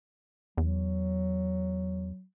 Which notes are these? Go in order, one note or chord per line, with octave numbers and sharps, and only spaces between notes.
E2 F#3